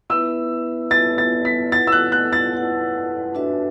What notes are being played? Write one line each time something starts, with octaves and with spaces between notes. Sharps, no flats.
B3 E4 B4 E5 E6
B3 E4 B4 E5 A6
A6
B6
E4 B4 F#5 A6
E6
F#6
F#6
A6
E4 B4 F#5
D4 F#4 B4 E5